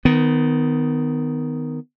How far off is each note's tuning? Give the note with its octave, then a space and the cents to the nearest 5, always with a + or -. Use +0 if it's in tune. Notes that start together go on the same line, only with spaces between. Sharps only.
D#3 +0 B3 +25